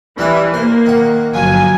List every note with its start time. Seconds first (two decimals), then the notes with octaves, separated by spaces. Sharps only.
0.18 E3 G3 D4 E5
0.54 A#3 C5
0.86 D#3 F#5
1.34 G1 F3 F#3 G#5